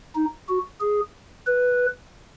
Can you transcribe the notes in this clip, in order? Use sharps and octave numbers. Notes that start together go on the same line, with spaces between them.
D#4
F#4
G#4
B4